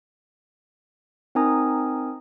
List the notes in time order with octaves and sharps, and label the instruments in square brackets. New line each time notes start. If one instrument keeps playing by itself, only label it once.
[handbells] C4 D#4 A#4 G#5 A#5 D#6